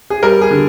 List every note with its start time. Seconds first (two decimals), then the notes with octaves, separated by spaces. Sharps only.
0.10 G#4
0.23 G3 A#4
0.41 G#4
0.51 D3